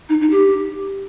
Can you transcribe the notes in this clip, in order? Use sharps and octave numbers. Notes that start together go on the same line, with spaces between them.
D#4
D#4
G4